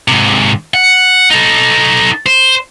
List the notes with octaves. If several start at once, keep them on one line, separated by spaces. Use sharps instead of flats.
G#2 C3
F#5
D#4 A4
C5